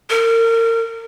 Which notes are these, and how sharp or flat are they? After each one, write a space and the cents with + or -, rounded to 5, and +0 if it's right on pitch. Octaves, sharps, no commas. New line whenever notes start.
A#4 -35